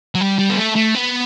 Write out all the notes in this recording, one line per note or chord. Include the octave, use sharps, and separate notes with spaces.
F#3
G3
G3
B3
A3
A3
B3